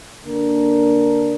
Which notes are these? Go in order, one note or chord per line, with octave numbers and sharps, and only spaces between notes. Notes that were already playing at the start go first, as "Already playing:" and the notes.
D3 A#3 D4 A#4